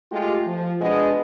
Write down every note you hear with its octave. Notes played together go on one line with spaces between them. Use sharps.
G#3 A3 F4 G4
F3
B2 G#3 B3 D4 G#4 D#5